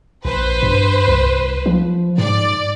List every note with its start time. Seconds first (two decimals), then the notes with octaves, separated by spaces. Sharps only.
0.25 A#1 B4 C5
0.63 G2
1.08 C2
1.66 F3
2.18 G#2 D5